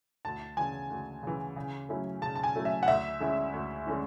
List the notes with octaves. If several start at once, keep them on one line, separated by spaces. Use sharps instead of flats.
D2 A5
C#3 E3 G#5
D2
C#3 E3
C#3
F#3 A3 C#4 E4
C#3 A5
A5
G#5
F#3 A3 C#4 E4
E5
F#5
D2 E5
D3 G#3 C#4 E4
D2
D3 G#3 C#4 E4